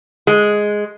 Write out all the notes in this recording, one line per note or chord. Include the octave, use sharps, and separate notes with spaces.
G#3